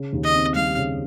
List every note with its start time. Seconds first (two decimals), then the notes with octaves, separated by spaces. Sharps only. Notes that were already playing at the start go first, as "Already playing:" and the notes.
Already playing: C#3
0.13 D#2
0.23 D#5
0.34 C4
0.55 G3 F5
0.77 C#3